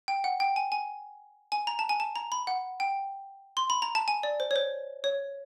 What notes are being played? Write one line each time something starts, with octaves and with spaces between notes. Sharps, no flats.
G5
F#5
G5
G#5
G#5
G#5
A#5
A5
G#5
A5
A#5
B5
F#5
G5
C6
B5
A#5
A5
G#5
D5
C5
C#5
C5
C#5